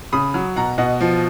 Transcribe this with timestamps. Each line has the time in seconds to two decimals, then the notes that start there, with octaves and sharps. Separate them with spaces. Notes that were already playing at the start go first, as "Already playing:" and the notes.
0.12 C#3 B5 D#6
0.34 F#3
0.56 B2 F#5 A#5
0.78 B2 D#5 F#5
1.01 F3